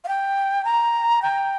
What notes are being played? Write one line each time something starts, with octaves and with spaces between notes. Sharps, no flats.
F5
G5
A#5
G5